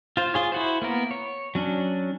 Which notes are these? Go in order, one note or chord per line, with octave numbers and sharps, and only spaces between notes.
F4 C5
F4 G#4 C#5
E4 F#4 C5
A#3 B3 A#4
C#5
F#3 C#4 D4